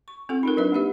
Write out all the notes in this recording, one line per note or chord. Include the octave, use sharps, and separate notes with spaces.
C#6
C4 F4 A4 F#5
D#4 F4 A#4
F#3 D4 A#4 B4 E5
A#3 D#4 G4 E5